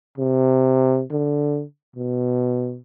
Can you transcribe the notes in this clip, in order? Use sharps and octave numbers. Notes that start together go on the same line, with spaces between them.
C3
D3
B2